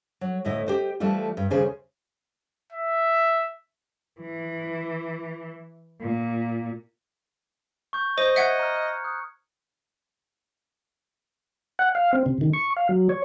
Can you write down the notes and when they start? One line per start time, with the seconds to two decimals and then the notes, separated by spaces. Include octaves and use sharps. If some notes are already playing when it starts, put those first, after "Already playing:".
0.21 F#3
0.45 D2 A2 E4 D#5
0.66 G4 C5 D#5
1.00 E3 F3 G3 A3 F4
1.37 G2
1.50 D#2 C#3 G#4 C5
2.72 E5
4.21 E3
6.01 A#2
7.93 C#6 G6
8.18 C5 D#5
8.36 E5 F#5 F#6 G#6 C#7
8.59 A#5 F6
9.04 D#6 F#6
11.79 F#5
11.95 F5
12.13 C4
12.26 C3
12.41 D#3
12.53 C#6
12.76 F5
12.89 F#3
13.09 C#5